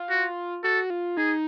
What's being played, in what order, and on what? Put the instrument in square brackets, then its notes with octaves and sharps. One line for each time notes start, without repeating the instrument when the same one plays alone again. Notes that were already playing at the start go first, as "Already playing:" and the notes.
Already playing: [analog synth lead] F4
[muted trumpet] F#4
[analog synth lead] F#4 [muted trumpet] A4
[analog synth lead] F4
[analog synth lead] D#4 [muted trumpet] G#4